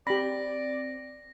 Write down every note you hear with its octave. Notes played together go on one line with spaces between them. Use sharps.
C4 G4 D5 B5 A#6